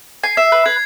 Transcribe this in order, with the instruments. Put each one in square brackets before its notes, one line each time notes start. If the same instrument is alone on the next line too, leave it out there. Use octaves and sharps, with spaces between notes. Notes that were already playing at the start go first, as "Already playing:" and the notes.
[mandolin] G#5 [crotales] C7
[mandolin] E5
B4
[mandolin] B4 [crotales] G#6